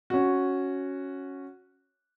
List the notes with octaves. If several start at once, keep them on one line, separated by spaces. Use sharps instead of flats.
C#4 F#4